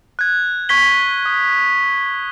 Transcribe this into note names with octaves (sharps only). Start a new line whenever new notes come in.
F#6 G#6
C#6 G#6 B6 G7
D#6